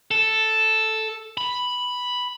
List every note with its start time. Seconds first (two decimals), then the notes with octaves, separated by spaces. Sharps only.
0.11 A4
1.38 B5